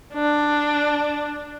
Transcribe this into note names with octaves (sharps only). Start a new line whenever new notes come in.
D4